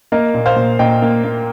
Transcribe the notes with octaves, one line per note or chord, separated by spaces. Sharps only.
A#3 A#4 D#5
A#2
C5 F5
A#2
A#2 D#5 G5
A#3
A#3